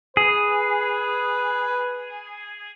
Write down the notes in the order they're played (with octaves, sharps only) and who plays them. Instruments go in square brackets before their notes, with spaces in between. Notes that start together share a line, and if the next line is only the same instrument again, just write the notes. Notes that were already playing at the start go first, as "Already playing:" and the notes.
[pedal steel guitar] G#4 [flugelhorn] B4